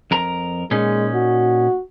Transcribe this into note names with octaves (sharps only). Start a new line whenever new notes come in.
F2 A#4 A#5
A#2 G#3 C#4 D#4
F#4